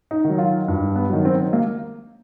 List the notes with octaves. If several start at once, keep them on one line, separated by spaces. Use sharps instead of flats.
D#4
D#3
F#3
F4
G2
B3
D#3 F#3
C4
A#3